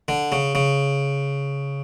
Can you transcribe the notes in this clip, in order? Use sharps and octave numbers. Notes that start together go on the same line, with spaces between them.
D3
C#3
C#3